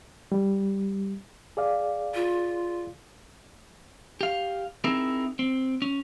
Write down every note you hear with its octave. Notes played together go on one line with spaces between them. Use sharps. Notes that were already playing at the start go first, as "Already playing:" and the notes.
G3
G#4 D5 F5
F4
G4 F5
C4 D#4 E4 G#4 A#4
C4
C#4